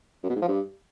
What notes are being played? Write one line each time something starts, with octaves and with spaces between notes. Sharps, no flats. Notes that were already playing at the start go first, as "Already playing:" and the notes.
F#2
B2
G#2
F3
G2